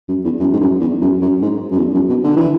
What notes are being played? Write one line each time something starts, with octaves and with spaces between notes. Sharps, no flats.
F#2
E2
F#2
G#2
F#2
E2
F#2
F#2
G#2
F#2
E2
F#2
B2
D3
E3